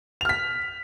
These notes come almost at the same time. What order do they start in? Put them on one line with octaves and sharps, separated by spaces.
F7 F6 B6